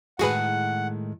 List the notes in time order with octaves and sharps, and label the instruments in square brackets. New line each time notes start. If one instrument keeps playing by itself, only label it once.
[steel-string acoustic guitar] A2 D#3 G#3 [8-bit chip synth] F#4 G#4 B4 [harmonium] F#5